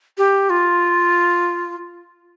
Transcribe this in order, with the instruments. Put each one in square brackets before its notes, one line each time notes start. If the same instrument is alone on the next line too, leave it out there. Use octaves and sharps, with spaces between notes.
[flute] G4
F4